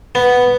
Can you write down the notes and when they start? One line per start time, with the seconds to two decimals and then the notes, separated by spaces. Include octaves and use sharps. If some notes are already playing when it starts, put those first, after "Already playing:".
0.15 B3